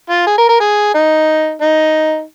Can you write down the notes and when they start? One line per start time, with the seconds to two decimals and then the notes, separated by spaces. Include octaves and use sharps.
0.10 F4
0.27 G#4
0.38 A#4
0.49 A#4
0.61 G#4
0.94 D#4
1.61 D#4